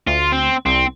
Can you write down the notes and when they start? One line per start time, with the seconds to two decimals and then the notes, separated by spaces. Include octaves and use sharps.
0.07 D2 F4
0.32 C4
0.66 C2 C4